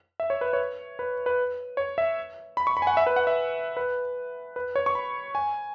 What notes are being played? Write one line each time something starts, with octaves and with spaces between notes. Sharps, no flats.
E5
C#5
B4
C#5
B4
B4
C#5
E5
B5
C#6
B5
G#5
F#5
E5
B4
F#5
E5
B4
B4
C#5
C#6
B5
G#5